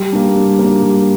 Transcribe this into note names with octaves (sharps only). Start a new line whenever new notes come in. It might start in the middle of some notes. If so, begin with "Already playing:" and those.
Already playing: G3
A#3 D4
G3
A#3 D4
G3